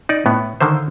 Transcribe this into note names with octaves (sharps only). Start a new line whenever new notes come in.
D#4 D5
A2 B3
D3 D#3 C5